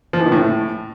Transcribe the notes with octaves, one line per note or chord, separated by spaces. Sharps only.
F3
E3
D#3
A2